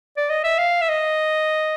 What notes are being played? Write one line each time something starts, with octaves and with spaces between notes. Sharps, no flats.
D5
D#5
E5
F5
E5
D#5